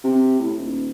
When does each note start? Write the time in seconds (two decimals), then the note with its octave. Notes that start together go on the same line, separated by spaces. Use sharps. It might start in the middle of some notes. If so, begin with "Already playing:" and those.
0.04 C3
0.39 A2
0.57 D#1